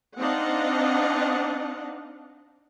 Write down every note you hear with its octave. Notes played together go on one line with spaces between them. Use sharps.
C4 D4 D#4 D#5 F5 F#5